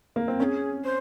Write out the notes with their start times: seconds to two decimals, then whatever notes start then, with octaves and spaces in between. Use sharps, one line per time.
0.16 A#3
0.28 C4
0.40 C#4 G#4 A#4
0.84 C5